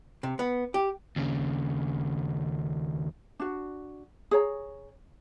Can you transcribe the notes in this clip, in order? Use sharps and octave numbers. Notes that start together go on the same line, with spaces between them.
C3
B3
G4
D#2 C#3
D4 F#4
G#4 C#5 A#5